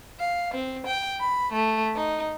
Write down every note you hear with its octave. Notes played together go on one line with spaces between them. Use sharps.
F5
C4
G5
B5
A3
D#4